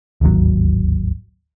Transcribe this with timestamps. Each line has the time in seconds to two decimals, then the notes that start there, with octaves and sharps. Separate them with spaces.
0.21 D1 G#1 D#2 F#3